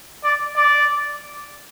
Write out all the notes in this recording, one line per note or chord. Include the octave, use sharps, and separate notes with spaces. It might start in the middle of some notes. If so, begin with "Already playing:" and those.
D5
D5